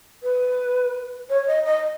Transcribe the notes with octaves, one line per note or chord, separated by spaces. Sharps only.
B4
C#5
D#5
D#5